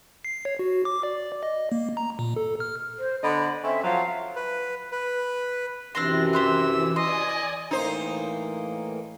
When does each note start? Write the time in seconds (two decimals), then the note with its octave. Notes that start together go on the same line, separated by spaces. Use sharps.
0.25 C7
0.45 C#5
0.59 F#4
0.85 D6
1.03 D5
1.43 D#5
1.72 A#3
1.97 A#5
2.19 A#2
2.36 A4
2.60 F6
2.98 C5
3.24 D3 B3 D#5 B5
3.64 C4 C#4 A4 E5
3.84 F3 F#3 F5
4.36 B4
4.92 B4
5.95 F#2 C3 E3 C4 D4 C6 A#6
6.33 G4 C6 E6 F#6
6.96 D5 D#5 G#5 C6
7.71 A2 E3 A#3 D#4 C5